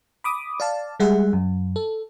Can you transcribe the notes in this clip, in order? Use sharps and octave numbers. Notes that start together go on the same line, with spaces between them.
B5 D6 D#6
D5 F5 A5
G3 G#3 G#4 E5 F#5
F#2
A4